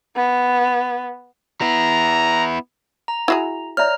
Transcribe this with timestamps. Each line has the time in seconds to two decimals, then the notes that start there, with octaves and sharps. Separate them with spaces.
0.15 B3
1.61 B3 E4 A#5
3.08 A#5
3.28 E4 F#4 G#4
3.77 C#5 D5 E5 A#5 F6